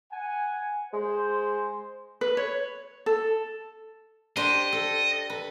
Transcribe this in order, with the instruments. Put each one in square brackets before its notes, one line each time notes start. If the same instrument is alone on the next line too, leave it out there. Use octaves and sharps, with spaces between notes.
[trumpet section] F#5 G#5
[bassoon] G#3 [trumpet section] C5
[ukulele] B4
C#5
A4
[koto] D4 G4 C5 [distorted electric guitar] D#5
[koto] A4
B4